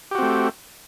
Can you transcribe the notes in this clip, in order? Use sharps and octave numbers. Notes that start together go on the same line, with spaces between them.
A3 C4 F#4 G4